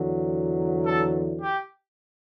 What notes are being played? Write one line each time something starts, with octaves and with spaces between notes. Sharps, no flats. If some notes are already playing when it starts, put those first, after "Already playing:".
Already playing: E2 D3 F#3
A4
G4